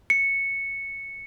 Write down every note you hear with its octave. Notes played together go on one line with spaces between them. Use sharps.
C#7